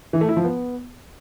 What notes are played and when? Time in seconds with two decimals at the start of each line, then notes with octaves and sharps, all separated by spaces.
0.13 E3
0.21 A3
0.29 E4
0.36 F3
0.44 B3